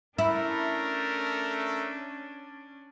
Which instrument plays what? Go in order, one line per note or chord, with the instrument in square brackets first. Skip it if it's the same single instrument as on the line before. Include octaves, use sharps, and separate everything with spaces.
[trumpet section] A3 [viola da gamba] C#4 D4 [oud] E4 [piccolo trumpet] A#4